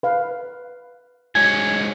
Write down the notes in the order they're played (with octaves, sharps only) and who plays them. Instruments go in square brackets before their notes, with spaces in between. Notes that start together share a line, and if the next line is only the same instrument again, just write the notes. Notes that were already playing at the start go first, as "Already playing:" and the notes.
[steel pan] B4 F5
[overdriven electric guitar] G#2 F#3 [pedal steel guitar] G#5